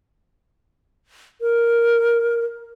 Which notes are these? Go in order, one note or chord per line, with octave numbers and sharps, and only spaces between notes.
A#4